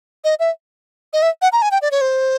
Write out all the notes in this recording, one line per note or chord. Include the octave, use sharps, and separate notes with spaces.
D#5
E5
D#5
E5
F#5
A#5
G#5
G5
D5
C#5
C5